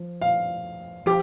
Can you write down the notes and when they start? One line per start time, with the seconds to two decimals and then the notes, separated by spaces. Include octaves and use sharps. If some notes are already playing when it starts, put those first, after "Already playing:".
Already playing: F3
0.21 F5
1.06 F3 G4